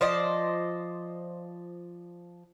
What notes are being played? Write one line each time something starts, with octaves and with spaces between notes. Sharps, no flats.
F3 C5 D5 D#5